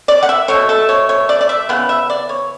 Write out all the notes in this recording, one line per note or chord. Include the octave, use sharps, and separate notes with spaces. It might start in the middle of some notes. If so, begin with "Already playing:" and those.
D5
F#5
E5
B2 A3 C#5
A4
C#5
C#5
D5
D5
E5
C#3 E3 B3 F#5
E5
D5
C#5